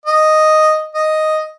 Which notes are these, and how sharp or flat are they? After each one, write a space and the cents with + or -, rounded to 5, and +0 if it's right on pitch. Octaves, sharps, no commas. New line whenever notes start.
D#5 +0
D#5 +0